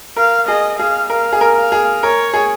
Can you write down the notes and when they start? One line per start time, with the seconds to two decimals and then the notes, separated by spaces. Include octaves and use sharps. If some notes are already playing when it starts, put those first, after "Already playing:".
0.16 A#4 F5
0.48 G#4 D#5
0.79 G#4 F5
1.09 A#4 F5
1.33 G#4
1.41 A#4
1.57 F5
1.72 G#4
2.03 A#4 C#5
2.34 G#4